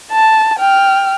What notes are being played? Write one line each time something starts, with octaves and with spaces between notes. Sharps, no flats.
A5
G5 F6